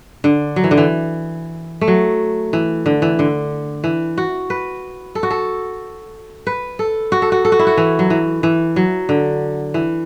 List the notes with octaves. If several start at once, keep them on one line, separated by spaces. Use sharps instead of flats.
D3
F#3
E3
D3
E3
A3
F#3
E3
D3
E3
D3
E3
F#4
B4
A4
F#4
A4
B4
A4
F#4
A4
F#4
A4
F#4
E4
F#4
E3
F#3
E3
E3
F#3
D3
E3